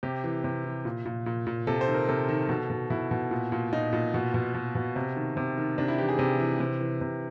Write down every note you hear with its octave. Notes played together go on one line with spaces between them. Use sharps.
C3 G4
E3
C3
E3
A#2
A#2
A#2
A#2
C3 A4
C5
D#3
A#4
C3 A4
D#3
B2
B2
B2 E4
B2
A#2
A#2
A#2 D#4
A#2
B2
B2
B2
B2
C3
D#3
C3
D#3
C3 D4
E4
E3 G4
G#4
C3
E3
C3
E3
C3